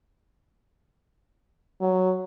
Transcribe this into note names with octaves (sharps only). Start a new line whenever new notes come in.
F#3